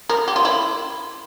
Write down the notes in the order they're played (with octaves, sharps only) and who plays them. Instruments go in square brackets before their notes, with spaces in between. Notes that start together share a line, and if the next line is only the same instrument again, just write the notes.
[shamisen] A#4
G4
F4
E4